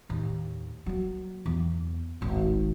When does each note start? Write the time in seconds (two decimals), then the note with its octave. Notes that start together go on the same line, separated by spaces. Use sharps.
0.09 D#2 A2
0.86 F#3 A#3
1.46 E2
2.21 D1 G#1